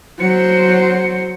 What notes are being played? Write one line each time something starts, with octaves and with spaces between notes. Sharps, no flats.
F#3 C5 C#7